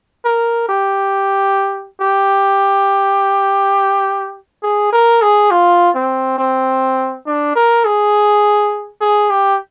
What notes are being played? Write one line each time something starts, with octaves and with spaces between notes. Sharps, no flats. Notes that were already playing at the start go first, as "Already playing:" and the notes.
A#4
G4
G4
G#4
A#4
G#4
F4
C4
C4
D4
A#4
G#4
G#4
G4